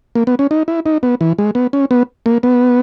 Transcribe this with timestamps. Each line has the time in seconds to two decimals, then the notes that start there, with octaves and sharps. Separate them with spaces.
0.15 A#3
0.27 B3
0.39 C#4
0.51 D#4
0.68 E4
0.86 D#4
1.03 B3
1.21 E3
1.38 G#3
1.55 B3
1.73 C#4
1.91 B3
2.26 A#3
2.43 B3